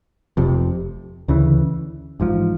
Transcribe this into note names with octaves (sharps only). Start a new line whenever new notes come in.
F1 F2 C3
D2 C#3 E3
A1 G#2 F3